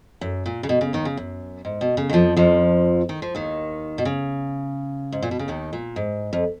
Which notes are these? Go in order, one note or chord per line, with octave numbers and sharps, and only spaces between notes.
F#2
A#2
C#3
B2
C#3
D#2 D#3
C#3
F#2
G#2
B2
C#3
D#3
F2 F3
F2 F3
D#3
F3
D#2 D#3
B2
C#3
G#2
A#2
B2
C#3
D#2 D#3
A#2
G#2
F2